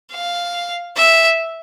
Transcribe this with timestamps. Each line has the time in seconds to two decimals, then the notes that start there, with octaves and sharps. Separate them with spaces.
0.12 F5
0.97 E5